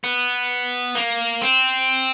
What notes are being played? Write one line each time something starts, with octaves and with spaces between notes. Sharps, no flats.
B3
A#3
C4